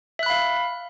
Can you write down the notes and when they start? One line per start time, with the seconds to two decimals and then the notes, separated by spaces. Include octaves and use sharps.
0.19 E5
0.23 F#6
0.26 B5
0.30 F5